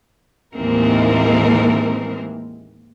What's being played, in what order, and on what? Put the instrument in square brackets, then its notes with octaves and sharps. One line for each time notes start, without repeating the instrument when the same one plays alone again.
[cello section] D#2 A2 E3 G#3 C4 A#4